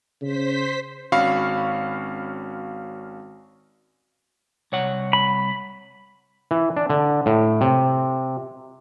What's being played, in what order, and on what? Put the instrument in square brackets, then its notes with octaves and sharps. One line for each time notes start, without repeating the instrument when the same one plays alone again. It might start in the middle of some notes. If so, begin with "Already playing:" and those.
[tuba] C#3 [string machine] C5 B6
[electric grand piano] G#1 C#4 F#4 F5 B5 C#6
[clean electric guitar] C2 C#5 F#5
[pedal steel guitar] B5
[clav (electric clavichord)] E3
D4
D3
A2
C3